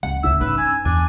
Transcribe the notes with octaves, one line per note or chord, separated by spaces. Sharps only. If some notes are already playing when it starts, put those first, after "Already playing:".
C#2 F#5
D2 C#3 C#4 E5 E6
G2 C#4 D#4 B4
G#5
E2 D4 G#5